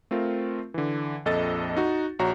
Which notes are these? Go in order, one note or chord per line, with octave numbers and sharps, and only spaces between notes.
A3 C4 F4 A#4
D3 E3
A#1 F2 A4 D#5 A6
D#4 F#4
A#1 F#4 C#5 A#5